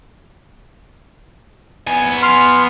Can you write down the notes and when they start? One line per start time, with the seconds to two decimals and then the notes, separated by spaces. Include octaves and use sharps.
1.87 B3 G#5
2.22 C6 F6